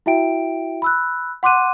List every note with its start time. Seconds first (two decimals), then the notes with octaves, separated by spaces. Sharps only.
0.06 E4 F#4 E5 G5 D7
0.82 B5 E6 F#6
1.43 F#5 C6 D6 F#6 D#7